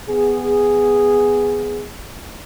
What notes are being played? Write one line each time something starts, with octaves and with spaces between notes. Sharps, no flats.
B3 G#4